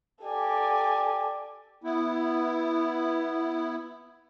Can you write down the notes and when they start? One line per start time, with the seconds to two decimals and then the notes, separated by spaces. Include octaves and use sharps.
0.23 G4 A4 D5 G#5
1.84 B3 E4